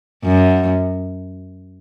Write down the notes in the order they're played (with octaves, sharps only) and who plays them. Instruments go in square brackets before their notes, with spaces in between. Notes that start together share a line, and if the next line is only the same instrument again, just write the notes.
[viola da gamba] F#2